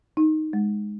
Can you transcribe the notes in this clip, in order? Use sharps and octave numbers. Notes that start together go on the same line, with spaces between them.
D#4
G#3